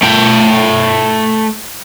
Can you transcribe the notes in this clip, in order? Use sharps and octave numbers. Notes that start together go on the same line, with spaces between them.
A3 G5